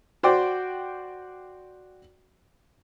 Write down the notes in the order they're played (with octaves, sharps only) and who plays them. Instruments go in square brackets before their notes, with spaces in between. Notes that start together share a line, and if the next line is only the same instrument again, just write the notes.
[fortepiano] F#4 C5 D5 G5